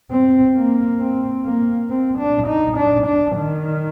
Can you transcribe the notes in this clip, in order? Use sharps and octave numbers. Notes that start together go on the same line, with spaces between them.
C4
A#3
C4
A#3
C4
D4
D#4
D4
D4
D#3